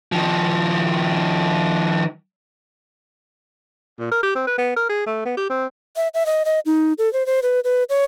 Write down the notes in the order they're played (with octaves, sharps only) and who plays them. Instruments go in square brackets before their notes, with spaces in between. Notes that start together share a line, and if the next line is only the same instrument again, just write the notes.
[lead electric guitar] D#3 F3
[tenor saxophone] A#2
A#4
G4
C4
B4
B3
A#4
G#4
A3
B3
G4
C4
[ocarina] E5
E5
D#5
D#5
D#4
A4
C5
C5
B4
B4
C#5